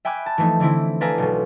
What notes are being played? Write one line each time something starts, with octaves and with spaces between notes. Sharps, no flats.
E5 G5 G#5 B5 D6 F#6
A5
E3 F3 A3 D#4
D3 E3 C4 E4
A4 B4 D5 F5 G#5 A#5
B1 B2